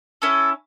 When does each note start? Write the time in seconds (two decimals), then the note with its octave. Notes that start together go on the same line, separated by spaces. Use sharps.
0.22 C#4 E4 A4